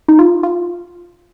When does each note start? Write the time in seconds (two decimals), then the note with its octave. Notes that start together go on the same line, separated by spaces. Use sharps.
0.08 D#4
0.19 F4
0.43 F4